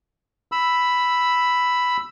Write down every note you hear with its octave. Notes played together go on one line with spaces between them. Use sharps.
B5 E6